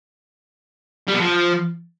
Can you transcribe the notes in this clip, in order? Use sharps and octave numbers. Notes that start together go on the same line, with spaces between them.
G3
B2
F3